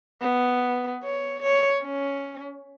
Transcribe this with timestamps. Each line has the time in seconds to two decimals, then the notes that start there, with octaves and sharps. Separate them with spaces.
0.21 B3
1.04 C#5
1.42 C#5
1.83 C#4